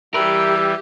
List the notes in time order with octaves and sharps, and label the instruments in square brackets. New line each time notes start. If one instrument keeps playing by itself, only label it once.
[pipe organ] E3 G3 [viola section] G4 [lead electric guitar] A#4 B4 [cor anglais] E5